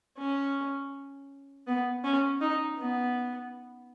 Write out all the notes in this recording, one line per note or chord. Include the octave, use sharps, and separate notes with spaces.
C#4
B3
C#4
D#4
B3